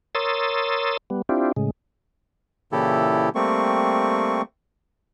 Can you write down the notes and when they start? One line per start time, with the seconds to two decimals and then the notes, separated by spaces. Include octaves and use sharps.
0.15 A#4 C#5 C6 D#6 E6 A6
1.10 G3 B3
1.29 C4 D4 E4 F4 G4
1.56 A2 C#3 G#3
2.72 A#2 C#3 E3 E4 G4 A4
3.35 G3 A3 A#3 C4 C#6